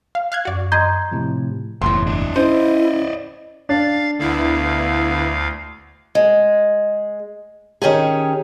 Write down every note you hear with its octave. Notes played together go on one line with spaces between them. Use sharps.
F5
F5 F#6 G#6
F#2 F#4 D5 C#6
D#5 A#5 C6 G6 G#6
A2 C3 F3
F#1 B1 E2 A2 C6
D4 E4
C#4 E4 C5 D5 D#5
D4 F5 A6
D2 D3 B3 E4 F5
G#3
D#3 C#4 G4 G#4